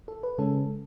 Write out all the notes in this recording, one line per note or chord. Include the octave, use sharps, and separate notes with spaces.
A4
B4
C#3 G#3 C#4 A4